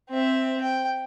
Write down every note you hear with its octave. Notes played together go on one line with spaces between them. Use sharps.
C4 E5
G5